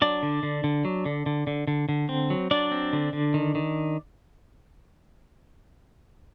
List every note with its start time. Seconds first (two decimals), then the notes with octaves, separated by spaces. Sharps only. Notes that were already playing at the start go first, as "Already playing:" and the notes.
0.02 F#3 D4 D5
0.23 D3
0.43 D3
0.64 D3
0.85 F#3
1.05 D3
1.26 D3
1.47 D3
1.67 D3
1.89 D3
2.09 C4
2.30 F#3
2.51 F#3 D4 D5
2.72 C4
2.93 D3
3.13 D3
3.34 D#3
3.55 D#3